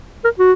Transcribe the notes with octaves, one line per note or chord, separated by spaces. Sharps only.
A#4
F#4